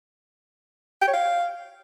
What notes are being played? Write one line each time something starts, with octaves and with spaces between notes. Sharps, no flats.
G5
C#5
F5